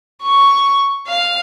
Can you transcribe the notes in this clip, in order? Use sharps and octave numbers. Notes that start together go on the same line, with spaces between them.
C#6
F5